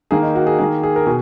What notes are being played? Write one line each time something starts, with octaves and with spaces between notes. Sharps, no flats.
D#3 A#3 G#4
D#4
F#4
G#4
D#3 A#3 G#4
G#4
A#4
B2 G#4